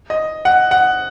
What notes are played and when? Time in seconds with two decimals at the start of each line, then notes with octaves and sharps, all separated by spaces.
0.10 D#5
0.45 F#5
0.71 F#5